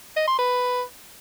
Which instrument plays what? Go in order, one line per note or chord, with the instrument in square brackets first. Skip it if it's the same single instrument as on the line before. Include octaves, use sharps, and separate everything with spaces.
[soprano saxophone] D#5
C6
B4